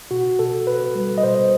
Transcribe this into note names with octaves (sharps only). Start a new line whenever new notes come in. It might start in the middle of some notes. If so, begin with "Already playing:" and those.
B2 F#4
B2 A4
B2 B4
G3
D#5
B2 C5